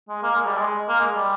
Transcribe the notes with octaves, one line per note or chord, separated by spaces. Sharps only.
G#3
A#3
G#3
G3
G#3
A#3
G#3
G3